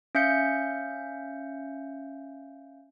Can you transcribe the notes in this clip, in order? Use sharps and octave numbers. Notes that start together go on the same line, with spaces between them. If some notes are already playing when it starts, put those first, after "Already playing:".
C#4 E5 F5 G6 C#7